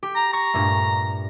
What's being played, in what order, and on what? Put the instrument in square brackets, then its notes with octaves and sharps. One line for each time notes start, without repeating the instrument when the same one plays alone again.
[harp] G4
[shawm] A#5
[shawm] A#5 [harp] C#6 A#6
[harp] G2 A#2 A3